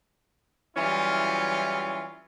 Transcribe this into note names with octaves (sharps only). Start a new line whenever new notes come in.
E3 F#3 G3 C#4 E4 F4